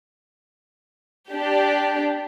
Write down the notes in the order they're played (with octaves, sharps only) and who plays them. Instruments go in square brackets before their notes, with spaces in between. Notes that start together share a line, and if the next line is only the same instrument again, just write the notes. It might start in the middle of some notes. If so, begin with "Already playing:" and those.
[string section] D4 G4